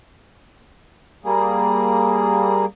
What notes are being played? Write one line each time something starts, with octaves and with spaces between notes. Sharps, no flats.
G3 A#3 G#4